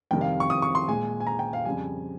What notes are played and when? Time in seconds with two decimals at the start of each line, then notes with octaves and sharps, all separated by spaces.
0.11 F2 C3 D#3 G3 G5
0.21 F5
0.40 C#6
0.50 D#6
0.62 C#6
0.75 C6
0.88 A#2 G#3 G#5
1.20 G#5
1.27 A#5
1.39 G5
1.53 F5
1.65 F2 C#3 G3 G#5